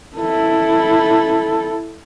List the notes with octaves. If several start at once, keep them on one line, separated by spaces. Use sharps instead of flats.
E4 A4